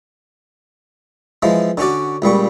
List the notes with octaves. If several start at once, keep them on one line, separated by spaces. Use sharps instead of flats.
E3 F3 G#3
D3 C#4 F#4 D5
C#2 A#2 G3 C#6